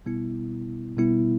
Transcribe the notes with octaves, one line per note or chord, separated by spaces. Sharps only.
B2 G3 B3 E4
B2 G3 B3 E4